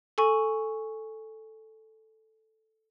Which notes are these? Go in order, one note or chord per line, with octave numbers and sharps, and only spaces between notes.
A4 G#5 C#6